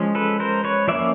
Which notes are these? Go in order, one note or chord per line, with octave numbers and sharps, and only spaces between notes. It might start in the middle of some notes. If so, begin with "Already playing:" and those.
Already playing: F3 G#3 C#4
A4 B4
A#4 C5
B4 C#5
F3 A#3 C#4 D5 E5